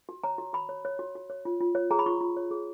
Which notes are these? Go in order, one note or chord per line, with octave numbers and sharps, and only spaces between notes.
F#4
C#5 A#5
F#4
F#4 B5
C#5
C#5
F#4
F#4
C#5
F4
F4
C#5
G#4 A#5
B5
F4 C#6
F4
C#5
G#4